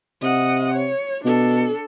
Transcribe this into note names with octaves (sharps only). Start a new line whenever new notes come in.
C3 D#5 F#5
C#5
B2 D4 A4